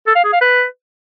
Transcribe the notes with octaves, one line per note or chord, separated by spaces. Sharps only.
A4
F5
G#4
F5
B4